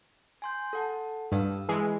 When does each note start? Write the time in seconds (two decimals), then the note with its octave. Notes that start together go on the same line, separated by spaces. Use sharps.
0.42 G#5 C6 G6
0.73 A4 F#5 A5
1.32 G2 F5 D#6 E6
1.69 E3 G#3